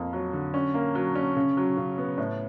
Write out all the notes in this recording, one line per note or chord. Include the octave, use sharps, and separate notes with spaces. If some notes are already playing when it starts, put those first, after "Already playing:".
Already playing: F2 A#3
F#3
D3
C#4
A#3
F#3
C#4
C#3
F#3
C#3
B3
A2